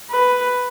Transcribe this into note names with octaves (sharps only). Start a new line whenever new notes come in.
B4